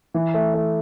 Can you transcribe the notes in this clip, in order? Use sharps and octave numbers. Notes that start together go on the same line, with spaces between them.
E3
A3
A3